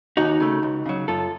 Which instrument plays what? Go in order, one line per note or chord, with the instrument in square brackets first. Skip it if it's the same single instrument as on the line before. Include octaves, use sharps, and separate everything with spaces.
[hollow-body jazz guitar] D#2 D#4 F#4
C#3 A3
C#2
C#3 F#3
F#2 F4 A4